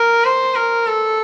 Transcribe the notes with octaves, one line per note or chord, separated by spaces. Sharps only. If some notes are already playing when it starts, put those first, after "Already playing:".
Already playing: A#4
C5
A#4
A4